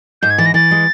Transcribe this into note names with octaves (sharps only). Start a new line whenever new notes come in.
G#2 G6
G#6
E3 A6
A#6
E3 A6
G#3